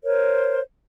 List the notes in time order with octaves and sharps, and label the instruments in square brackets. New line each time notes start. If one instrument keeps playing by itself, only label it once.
[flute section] A#4 C5 C#5